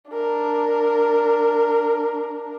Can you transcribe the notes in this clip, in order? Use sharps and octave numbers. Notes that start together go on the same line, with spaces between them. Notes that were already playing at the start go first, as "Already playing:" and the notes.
D4 A#4